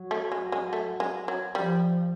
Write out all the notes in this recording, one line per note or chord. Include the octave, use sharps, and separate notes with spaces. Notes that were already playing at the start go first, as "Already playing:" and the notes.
Already playing: F#3
A3
G#3
G#3
A3
G#3
F#3
F3 G3